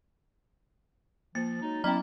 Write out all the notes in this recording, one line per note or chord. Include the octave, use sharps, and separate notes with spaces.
F3 A#3 A6
F#3 G#3 D#4
F#3 B3 C#4 E4 G5 A#5 F6